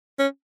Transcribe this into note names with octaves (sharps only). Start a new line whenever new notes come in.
C#4